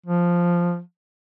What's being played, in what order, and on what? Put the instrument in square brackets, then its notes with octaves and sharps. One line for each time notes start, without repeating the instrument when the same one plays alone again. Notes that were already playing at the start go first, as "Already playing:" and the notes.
[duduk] F3